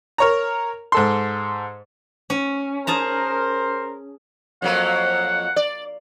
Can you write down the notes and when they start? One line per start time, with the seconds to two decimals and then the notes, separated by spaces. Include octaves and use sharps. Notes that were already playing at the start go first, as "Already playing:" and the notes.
0.18 A#4 C#5 A#5
0.92 G#2 A4 C6
2.30 C#4
2.87 G#4 A#4 C5 A5 A#5
4.62 F2 F#3 A#3 F#5
5.56 D5